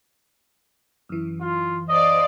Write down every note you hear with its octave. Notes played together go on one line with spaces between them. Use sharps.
F#2 E3
F4
C5 D5 D#5 F5